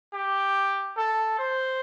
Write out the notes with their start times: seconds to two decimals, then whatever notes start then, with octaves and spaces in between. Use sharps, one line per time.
0.13 G4
0.97 A4
1.38 C5